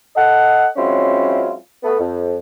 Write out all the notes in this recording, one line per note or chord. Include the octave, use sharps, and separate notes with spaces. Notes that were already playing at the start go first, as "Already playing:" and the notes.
A4 D#5 F#5
F#3 G#3 C4 C#4 E4 F4
A3 B3
F2